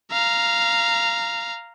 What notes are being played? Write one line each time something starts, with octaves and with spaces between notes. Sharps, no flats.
F5 A#5